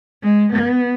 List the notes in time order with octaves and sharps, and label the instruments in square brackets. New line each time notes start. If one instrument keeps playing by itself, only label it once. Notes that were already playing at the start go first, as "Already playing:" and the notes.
[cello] G#3
B3